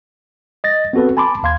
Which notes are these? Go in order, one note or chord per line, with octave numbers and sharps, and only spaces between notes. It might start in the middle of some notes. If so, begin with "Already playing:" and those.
D#5 A6 A#6
B3 C4 F#4 A4 B4
G#5 A5 B5 C6 D6
D#2 F5 C6 G#6